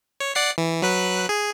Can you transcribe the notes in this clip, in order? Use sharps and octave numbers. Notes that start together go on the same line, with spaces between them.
C#5
D5 F#5 C7
E3
F#3 B4 F#6
G#4